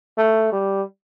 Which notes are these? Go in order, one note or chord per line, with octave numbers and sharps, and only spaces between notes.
A3
G3